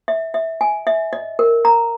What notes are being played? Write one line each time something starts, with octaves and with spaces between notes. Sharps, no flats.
E5
E5
G#5
E5
D#5
A#4
A#5